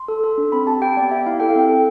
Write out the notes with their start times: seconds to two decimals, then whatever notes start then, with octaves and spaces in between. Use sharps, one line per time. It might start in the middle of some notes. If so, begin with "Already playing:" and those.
Already playing: C6
0.08 A4
0.24 A4
0.38 D4
0.52 C4 B5
0.67 G4 A5
0.81 G4 G5
0.97 B3 D5
1.11 G4 E5
1.26 E4 F5
1.40 A4 G5
1.49 F5
1.56 C4 G5
1.69 A4